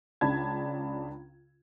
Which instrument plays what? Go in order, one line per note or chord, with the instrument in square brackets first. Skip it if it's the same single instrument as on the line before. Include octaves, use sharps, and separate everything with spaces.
[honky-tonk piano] C#2 C#3 D4 A5 B5 G#6